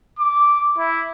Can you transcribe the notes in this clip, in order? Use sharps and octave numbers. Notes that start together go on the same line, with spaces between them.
D6
E4